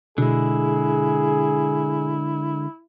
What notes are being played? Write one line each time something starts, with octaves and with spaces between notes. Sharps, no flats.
B2 D3 G#3 E4 G#4